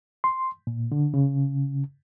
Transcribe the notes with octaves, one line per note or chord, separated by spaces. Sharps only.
C6
A#2
D3
C#3